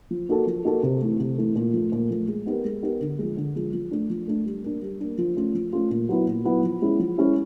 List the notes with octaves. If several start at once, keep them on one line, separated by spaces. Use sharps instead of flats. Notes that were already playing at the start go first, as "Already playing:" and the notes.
F3
A#3 D#4 F#4 A4
F3
A#3 D#4 F#4 A4
C3
E3 A3
C3
E3 A3
A#2
F3 A3
A#2
F3 A3
G#3
B3 D#4 G4 A#4
G#3
B3 D#4 G4 A#4
D3
F3 G#3
D3
F3 G#3
F3
A3 D4
F3
A3 D4
G3
A#3 D4
G3
A#3 D4
F3
A3 C#4 F4
F3
A3 C#4 F4
A#2
F#3 B3 E4
A#2
F#3 B3 E4
F3
G#3 C#4 E4
F3
G#3 C#4 E4